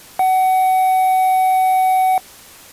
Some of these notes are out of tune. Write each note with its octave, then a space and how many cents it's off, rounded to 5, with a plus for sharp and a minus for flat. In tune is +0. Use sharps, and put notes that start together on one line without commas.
F#5 +25